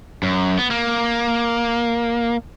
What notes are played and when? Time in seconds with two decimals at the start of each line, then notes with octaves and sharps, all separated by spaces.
0.23 F#2
0.58 B3
0.71 A#3